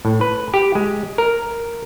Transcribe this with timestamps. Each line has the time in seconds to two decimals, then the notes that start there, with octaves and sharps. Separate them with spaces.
0.05 A2
0.21 B4
0.54 G4
0.75 G#3
1.18 A#4